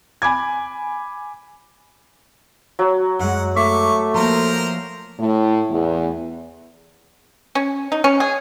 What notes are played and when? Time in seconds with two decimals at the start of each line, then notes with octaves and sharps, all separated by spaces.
0.22 G#5 B5 D6 G#6
2.79 F#3
3.19 F#2 G#3 F#5
3.56 A3 E5 C#6 D6
4.14 F3 A#3 A#4 C5 A#5
5.19 A2
5.70 E2
7.55 C#4
7.92 D#4
8.04 C#4
8.20 G#4